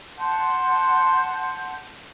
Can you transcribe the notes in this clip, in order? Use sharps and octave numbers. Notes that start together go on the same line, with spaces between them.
F#5 A5 C6 G6